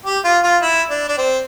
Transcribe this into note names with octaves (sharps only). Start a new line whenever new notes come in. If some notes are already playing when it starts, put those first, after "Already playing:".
G4
F4
F4
E4
D4
D4
C4